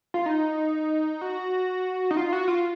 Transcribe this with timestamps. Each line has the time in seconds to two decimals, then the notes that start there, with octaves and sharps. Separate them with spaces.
0.14 F4
0.26 D#4
1.21 F#4
2.11 D#4
2.17 F4
2.33 F#4
2.48 F4